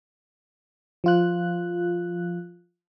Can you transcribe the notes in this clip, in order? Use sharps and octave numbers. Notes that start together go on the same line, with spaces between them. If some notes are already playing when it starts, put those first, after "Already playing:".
F3 F4 F#6